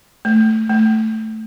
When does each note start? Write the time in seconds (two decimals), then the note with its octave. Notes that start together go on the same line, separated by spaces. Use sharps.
0.25 A3
0.70 A3